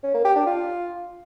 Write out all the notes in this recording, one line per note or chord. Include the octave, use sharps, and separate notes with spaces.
C#4
A#3
G4
D4
F4